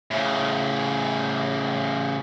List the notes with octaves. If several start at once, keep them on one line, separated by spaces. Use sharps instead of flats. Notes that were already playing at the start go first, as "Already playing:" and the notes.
A2 C#3